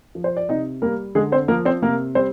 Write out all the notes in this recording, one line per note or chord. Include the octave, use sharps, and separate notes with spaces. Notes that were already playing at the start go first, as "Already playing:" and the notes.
F3
C5
D5
C3 D#4 D#5
G3 A#3 A#4
D3 G#3 G#4
C4 C5
F3 A#3 A#4
C4 C5
C3 A#3 A#4
G3 C4 C5